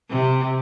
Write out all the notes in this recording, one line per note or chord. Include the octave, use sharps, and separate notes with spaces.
C3